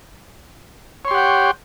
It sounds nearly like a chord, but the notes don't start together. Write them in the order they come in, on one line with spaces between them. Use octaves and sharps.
C#5 C6 G4 F#5 G5